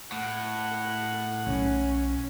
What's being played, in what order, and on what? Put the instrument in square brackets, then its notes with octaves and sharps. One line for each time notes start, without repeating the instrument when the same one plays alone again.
[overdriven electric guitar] A2 [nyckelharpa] F#5
[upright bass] B1 [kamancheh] C#4